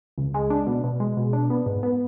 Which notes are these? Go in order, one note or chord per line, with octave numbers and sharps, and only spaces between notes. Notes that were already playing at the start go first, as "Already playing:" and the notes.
C#2
G#3
D4
B2
B2
G#3
B2
D4
B3
G#2
B3